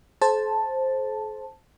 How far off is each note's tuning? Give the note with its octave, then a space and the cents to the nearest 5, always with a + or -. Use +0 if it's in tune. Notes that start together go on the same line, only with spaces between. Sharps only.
A4 -45 C5 +10 A5 +0